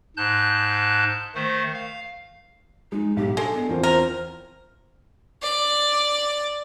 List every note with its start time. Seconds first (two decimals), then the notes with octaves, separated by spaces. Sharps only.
0.17 G#2 A5 F#6 G6
1.35 D#3 A3 C5
1.74 F5
2.92 G#3 D#4
3.17 B1 G4
3.37 G#3 D4 A4
3.54 B3
3.69 E2 C4 F4 A#4
3.83 A#4 C5
5.42 D5